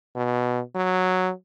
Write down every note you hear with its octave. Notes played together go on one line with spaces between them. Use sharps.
B2
F#3